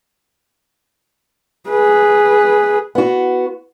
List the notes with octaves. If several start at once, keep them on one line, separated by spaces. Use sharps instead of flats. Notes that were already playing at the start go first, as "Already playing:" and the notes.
G#4 B4
B3 F#4